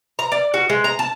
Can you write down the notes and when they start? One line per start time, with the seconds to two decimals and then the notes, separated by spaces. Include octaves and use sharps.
0.19 A#5
0.32 D5
0.54 F#4
0.70 G#3
0.84 A#5
0.99 A5